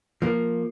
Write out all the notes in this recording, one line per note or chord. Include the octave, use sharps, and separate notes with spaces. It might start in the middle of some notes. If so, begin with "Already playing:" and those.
F3 A#3